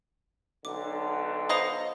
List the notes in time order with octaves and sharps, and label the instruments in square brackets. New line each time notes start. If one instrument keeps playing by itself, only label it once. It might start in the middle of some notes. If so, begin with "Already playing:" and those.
[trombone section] B1 D3 [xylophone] D6
[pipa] B2 B3 D#5 [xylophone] C5 F5 A#5